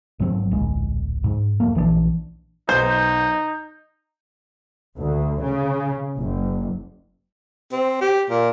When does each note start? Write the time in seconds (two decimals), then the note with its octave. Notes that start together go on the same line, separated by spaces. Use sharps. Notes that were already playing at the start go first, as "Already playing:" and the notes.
0.19 G#1 G#2 F#3 C4
0.51 D1 A#1 G#3
1.24 G#2
1.60 E1 C#2 A3 A#3
1.75 A#1 E3 F3 D4
2.69 B1 D#4 C5 G6
4.98 D2
5.42 C#3
6.20 F#1
7.72 C4
8.01 G4
8.30 A#2